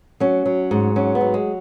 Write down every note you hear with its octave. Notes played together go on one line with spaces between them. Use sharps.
F#3 C#4
F#3
G#2
F#3 C#4
B3
F#3
G#3